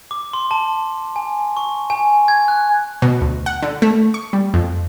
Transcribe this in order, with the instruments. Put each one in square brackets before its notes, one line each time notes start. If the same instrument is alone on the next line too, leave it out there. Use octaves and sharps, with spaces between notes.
[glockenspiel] D6
C6
A5
G#5
C#6
G#5
G#6
F#6
[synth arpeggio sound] B2
D2
F#5
D3
A3
C#6
G3
F2